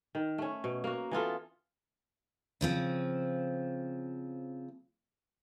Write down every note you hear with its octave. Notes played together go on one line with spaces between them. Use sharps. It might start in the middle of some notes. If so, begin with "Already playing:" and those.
D#3
A3 C#4
B2
A#3 F#4
E3 B3 F4 A4
C#3 F3 C4